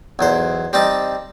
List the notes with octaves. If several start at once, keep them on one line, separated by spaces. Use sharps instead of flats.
B1 E2 C5
G3 C4 D#4 A5